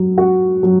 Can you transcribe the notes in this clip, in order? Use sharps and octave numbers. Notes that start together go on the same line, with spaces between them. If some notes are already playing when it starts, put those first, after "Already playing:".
Already playing: F#3
F#4
F#3